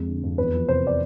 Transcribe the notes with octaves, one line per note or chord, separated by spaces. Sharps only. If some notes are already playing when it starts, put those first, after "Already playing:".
Already playing: F2 G#3
D3
F2
E2 B4
F3
C3 C5
D5